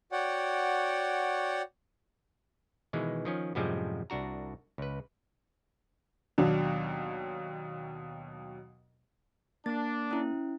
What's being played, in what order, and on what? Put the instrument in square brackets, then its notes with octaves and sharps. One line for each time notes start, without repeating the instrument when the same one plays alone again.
[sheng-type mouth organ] F#4 C#5 D5 F#5 G5
[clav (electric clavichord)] B2 D#3 E3 G#3
D#3 F3 C#4
F#2 A2 C3 F3 G3 G#3
C2 D4 F#4 A#5
C#2 B4
[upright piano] D#2 B2 F#3 D4
[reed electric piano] A#3 [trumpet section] D4 [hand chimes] A6
[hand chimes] C#4 E4